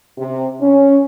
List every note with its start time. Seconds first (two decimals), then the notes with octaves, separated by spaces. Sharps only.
0.18 C3
0.61 C#4